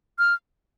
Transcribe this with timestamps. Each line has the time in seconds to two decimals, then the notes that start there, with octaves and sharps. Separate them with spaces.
0.19 F6